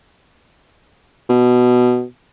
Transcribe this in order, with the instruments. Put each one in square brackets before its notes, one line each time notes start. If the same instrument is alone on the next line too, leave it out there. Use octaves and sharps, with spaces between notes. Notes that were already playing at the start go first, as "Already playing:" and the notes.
[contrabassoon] B2